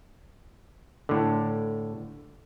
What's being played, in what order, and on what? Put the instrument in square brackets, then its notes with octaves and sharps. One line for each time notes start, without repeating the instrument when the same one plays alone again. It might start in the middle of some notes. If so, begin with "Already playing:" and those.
[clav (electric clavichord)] A2 D3